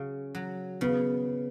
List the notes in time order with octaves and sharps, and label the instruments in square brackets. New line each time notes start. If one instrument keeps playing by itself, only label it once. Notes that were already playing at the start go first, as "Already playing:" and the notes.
Already playing: [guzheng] C#3 F#3
F#3
[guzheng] C#3 [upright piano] B3